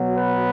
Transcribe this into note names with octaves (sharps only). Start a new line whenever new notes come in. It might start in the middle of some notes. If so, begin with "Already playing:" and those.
Already playing: B2 F#3
B4